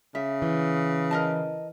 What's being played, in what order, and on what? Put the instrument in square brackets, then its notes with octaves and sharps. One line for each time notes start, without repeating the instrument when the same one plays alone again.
[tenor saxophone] C#3 [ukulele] E5
[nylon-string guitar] E3
[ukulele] A#4 D#5 A5